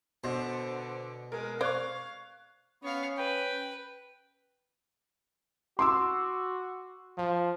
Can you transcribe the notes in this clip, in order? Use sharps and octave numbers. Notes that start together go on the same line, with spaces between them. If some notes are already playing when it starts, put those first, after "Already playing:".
B2 D3 C5
G#3 A#4
C5 D5 F5 C#6 F#6 G#6
B3 C#4 C#5 F5
B4 G5
F#4 C6 D6 E6
F3